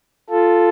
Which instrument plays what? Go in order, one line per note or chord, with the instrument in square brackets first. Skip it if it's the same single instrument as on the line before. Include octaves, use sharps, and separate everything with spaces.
[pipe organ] F4 A4